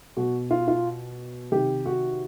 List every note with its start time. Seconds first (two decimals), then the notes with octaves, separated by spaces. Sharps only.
0.17 B2 F#4
0.51 F4
0.68 F4
1.51 C3 D#3 G4
1.86 F#4